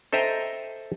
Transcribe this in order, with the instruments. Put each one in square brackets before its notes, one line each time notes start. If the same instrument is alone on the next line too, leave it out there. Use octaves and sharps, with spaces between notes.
[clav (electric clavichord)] A4 C5 D#5 E5 G5 A#5